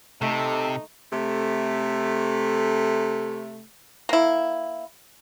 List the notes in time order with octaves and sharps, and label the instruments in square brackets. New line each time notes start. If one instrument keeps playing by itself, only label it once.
[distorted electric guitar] C3 [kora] A3 [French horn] D#4 [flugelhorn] A4
[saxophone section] C3 A3
[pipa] A#3 E4